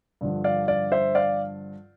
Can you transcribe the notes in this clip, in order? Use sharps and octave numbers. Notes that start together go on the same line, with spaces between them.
G2 D3 F3
D5 F5
D5 F5
C5 E5
D5 F5